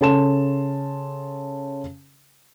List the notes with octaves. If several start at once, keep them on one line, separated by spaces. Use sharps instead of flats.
C#3 C#4 A4 A5 C6 E7